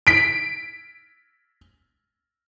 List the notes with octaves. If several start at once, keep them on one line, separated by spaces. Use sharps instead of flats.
B6 D7